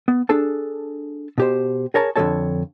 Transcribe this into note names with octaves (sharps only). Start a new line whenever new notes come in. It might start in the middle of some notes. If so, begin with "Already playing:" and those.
B3
D4 G#4 A4 A5
B2 G4 C5
G#4 A#4 C#5 A5 A#5
F2 D3 F3 A4 C#5 A5